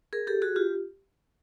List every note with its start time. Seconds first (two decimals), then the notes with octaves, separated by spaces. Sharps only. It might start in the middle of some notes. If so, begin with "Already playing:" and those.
0.13 G#4 A#4
0.27 G4 A4
0.42 F#4 G#4
0.56 F4 G4